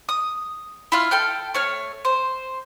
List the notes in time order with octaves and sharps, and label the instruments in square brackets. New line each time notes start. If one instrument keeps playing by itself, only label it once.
[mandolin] D#6
E4 F4 F6
A4 G5 F6
A3 C#5 F6
C5